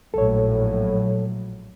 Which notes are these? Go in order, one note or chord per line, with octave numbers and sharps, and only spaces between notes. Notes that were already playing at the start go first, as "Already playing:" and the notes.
A#1 A2 F#3 A4 C#5